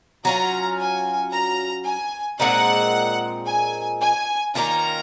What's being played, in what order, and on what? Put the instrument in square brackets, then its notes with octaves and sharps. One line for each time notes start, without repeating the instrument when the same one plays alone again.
[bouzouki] F#3 C#4 F4 [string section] A#5
[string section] G#5
A#5
G#5
[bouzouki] A#2 G#3 C4 D#4 [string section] F#5
[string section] G#5
G#5
[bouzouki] D#3 A#3 C#4 F4 [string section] A#5